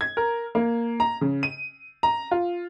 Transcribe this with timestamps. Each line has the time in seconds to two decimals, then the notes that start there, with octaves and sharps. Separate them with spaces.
0.01 G#6
0.17 A#4
0.55 A#3
1.00 A#5
1.21 C#3
1.43 D#7
2.03 A#5
2.31 F4